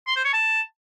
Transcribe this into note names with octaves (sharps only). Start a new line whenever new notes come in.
C6
C5
C#5
A5